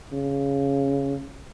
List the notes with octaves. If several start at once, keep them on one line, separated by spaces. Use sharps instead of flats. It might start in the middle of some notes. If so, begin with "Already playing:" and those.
C#3